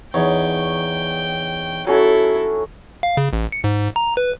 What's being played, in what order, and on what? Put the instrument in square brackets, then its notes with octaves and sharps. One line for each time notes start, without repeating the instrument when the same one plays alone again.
[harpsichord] E2 [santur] D#4 C#5 [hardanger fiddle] G5
[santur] F#3 C#4 F#4 [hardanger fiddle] E4 A4
[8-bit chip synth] F5
C#3
A1
C#7
G#2
A#5
B4